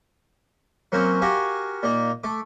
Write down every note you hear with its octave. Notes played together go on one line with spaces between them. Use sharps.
F#3 A#3 C4 C#4 C5
F#4 G4 A#4 F5 G#5
A#2 A#3 D#4
A3 D6